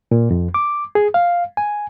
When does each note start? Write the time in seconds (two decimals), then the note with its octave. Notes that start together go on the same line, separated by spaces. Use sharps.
0.11 A#2
0.31 F2
0.54 D6
0.95 G#4
1.14 F5
1.57 G#5